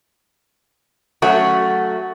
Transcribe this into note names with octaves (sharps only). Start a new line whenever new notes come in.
F#3 A3 C#4 F#4